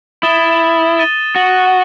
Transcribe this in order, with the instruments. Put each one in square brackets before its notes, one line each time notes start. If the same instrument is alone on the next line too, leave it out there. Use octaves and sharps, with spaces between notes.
[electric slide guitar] E4 [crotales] D#6 A6 E7 G7
[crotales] A6 D#7 G7
[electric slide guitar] F#4